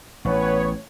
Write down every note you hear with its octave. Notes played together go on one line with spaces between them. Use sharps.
A1 B3 B4 C#5